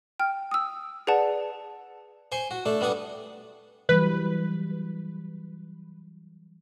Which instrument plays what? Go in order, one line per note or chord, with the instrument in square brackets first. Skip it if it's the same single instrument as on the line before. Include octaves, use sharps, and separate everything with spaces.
[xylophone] G5 F6
D#6 E6
G#4 B4 D5 F#5 A5
[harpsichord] C5 G#5 C6 C#6
F#4
A3 D4 A4
G3 B3 D4 C#6 D#6
[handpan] E3 F#3 G3 [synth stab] B4